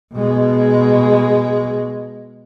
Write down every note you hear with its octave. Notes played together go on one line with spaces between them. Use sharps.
B2 G#3